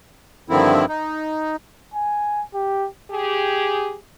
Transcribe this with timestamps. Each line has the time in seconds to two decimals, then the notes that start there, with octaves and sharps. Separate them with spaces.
0.50 G2 D3 D#3 F3 C4 E4
0.89 D#4
1.94 G#5
2.54 G4
3.11 G4 G#4